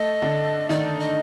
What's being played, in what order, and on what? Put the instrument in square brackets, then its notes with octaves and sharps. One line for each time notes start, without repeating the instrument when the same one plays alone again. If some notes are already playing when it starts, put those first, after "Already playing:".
Already playing: [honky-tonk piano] A3 A4 [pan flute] D#5
[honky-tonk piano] D3 D4
[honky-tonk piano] D#3 D#4 [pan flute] D5
[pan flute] D#5